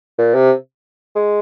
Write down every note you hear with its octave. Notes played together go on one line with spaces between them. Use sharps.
A#2
C3
G#3